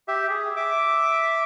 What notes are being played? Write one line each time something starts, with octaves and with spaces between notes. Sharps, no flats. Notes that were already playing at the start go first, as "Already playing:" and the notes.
G4 E5
G#4
E5 D6